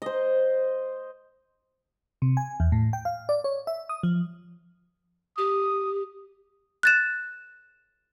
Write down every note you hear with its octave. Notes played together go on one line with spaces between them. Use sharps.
C5 D#5
C3
G#5
E2
A2
G5
F5
D5
C#5
E5
D#6
F3
G4 D#6
F#6 A6 E7